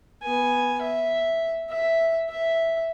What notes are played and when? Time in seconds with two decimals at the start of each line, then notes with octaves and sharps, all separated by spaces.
0.22 B3 G#5
0.82 E5
1.70 E5
2.29 E5